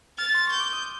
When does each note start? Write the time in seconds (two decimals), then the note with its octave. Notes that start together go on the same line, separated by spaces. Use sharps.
0.18 F6 A6
0.35 C6
0.47 C#6 G6
0.60 D6
0.73 D#6